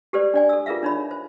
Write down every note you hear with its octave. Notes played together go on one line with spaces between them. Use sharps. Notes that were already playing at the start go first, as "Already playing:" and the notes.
G4 A4 B4 C5 D5
D4 D5 G#5
A4 E6
F4 G#4 A#4 B4 E5 F5
D4 D#4 C#5 B5
C5